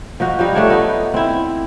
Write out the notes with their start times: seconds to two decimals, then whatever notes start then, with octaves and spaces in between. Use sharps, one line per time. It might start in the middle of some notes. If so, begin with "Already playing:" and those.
0.20 F3 D#4 F#4
0.39 F3 G3 D#4
0.55 A3 D4 C#5
0.70 B3 D#4 A4
1.14 C4 E4